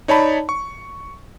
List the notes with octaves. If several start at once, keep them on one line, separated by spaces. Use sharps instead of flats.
D#4 C#5 D5 A5 B5
C#6